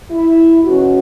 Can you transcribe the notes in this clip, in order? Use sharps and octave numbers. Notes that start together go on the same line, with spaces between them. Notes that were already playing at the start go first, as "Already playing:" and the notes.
E4
E2 B2 G#3 C#4 F#4